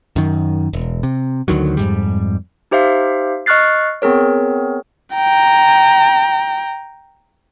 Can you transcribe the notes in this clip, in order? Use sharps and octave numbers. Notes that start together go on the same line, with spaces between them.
F#2 D#3
E1
C3
D2 D3 D#3 F#3
F2 G#2 G3
D#4 G4 C5 E5 F5
D#5 C#6 F6 F#6 A6 C7
B3 C4 G#4 A#4 C#5
G5 A#5